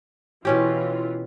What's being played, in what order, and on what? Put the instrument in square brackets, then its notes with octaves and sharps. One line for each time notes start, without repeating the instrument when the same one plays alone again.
[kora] B2 C#4 G4 [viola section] E3 E4 F4